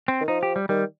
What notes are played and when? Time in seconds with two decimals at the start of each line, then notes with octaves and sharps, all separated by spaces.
0.08 C4
0.21 D#3
0.28 F3 D#4
0.43 G4
0.56 G3
0.69 D#3 G3